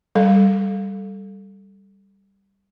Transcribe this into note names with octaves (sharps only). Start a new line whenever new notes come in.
G3 A4